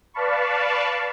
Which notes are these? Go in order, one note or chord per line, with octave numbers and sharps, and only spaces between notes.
B4 D5 F5 A5 B5 C#6